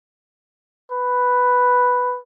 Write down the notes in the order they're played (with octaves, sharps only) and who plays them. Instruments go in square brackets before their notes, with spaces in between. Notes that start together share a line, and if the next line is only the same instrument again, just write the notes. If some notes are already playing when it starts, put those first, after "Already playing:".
[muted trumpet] B4